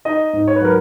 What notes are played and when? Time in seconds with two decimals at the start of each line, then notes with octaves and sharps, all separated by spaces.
0.05 D#4 D#5
0.33 G#2
0.47 C#5
0.56 B4
0.61 F#3 A#4